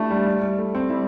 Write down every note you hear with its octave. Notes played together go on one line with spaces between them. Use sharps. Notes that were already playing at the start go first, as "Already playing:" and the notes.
Already playing: A3 D4 E4 G4 A4
G3
G3
G3
A3
C4
G3 E4